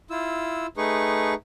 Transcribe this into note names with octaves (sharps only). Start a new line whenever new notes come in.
E4 F4 E6
A3 D#4 G#4 B4 C#6